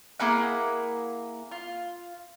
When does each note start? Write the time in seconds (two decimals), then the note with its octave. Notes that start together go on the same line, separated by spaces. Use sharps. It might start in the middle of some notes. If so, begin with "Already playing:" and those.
0.20 A#3 E4 G#4 F#5
1.51 F4